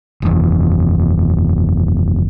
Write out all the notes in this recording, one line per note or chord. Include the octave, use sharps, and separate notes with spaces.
F#1 E2